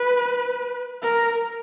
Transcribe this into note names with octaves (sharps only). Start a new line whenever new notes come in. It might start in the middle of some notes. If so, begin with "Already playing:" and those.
Already playing: B4
A#4